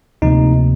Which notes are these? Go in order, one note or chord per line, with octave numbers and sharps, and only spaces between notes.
D2 C3 F3 A#3 D#4